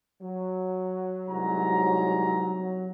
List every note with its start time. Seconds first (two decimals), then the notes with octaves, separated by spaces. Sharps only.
0.22 F#3
1.28 C2 G#2 A#5